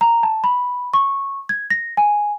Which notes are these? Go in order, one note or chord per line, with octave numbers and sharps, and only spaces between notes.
A#5
A5
B5
C#6
G#6
A#6
G#5